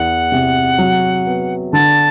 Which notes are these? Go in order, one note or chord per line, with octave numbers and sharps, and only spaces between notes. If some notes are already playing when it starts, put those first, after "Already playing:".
Already playing: E2 F#5
C3
F#3
B3
D3 A5